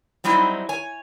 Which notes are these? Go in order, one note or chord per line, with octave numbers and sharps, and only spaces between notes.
F#3 G3 C4 D#4 E4
C#5 G#5